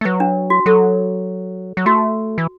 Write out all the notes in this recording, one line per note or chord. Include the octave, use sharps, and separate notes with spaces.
A3
F#3 B4
D4
F#4
F#3 A4
F#3
A3 F#4
E3